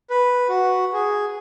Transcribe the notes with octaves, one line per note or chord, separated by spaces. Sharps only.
B4
F#4
G#4